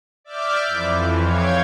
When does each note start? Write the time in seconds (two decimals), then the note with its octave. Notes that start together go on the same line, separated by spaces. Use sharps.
0.24 D5 E5 D6 F6 G6
0.67 F2 E3
1.21 C#5 F5 G5 G#6